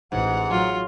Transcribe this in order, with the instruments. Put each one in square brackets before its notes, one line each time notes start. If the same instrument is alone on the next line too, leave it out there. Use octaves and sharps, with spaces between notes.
[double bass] A1 [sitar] G#2 [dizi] F#5
[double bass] F#3 [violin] F4